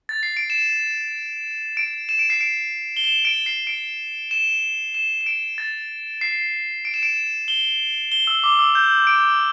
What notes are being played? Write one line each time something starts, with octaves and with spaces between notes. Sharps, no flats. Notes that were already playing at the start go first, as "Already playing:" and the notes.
A6
C7
D7
E7
D7
E7
D7
C7
D7
G7
E7
D7
C7
D7
E7
E7
E7
D7
A6
C7
D7
E7
D7
G7
G7
E6
D6
E6
G6
D7